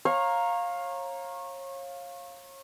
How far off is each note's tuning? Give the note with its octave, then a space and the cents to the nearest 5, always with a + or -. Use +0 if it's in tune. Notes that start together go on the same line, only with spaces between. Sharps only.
C#5 -30 F5 +10 A#5 +0